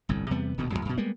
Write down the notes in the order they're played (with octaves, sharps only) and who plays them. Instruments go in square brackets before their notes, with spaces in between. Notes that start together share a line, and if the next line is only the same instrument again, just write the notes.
[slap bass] G1 C2 A2
E2 C3 G3 B3
D#1 D2 B2
C#2 F#2 A2 F#3
F#2 B2
G3 G#3 A#3 B3